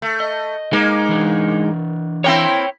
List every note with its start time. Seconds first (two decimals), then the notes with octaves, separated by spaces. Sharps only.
0.02 A3
0.20 D#5
0.73 G#3 A#3 D#4
1.09 E3 D4
2.24 A#3 C4 E4 C#5 G5